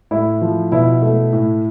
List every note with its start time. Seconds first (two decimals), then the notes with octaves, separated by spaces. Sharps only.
0.11 A2 E4
0.41 F3
0.72 B2 E4
1.03 A3
1.33 A2